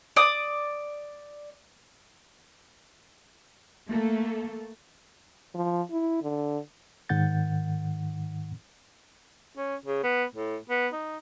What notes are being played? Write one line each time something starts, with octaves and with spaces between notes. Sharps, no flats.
D5 D6 D#6
A3 A#3 A4
F3
E4
D3
G#2 D#3 F#5 G6 A6
C#4
C#3
B3
A2
B3
D#4